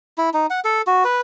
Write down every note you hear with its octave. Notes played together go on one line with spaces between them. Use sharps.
E4
D#4
F#5
A4
F#4
B4